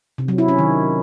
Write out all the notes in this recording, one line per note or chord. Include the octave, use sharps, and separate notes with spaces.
C3
F#3
E4
C#4
D#3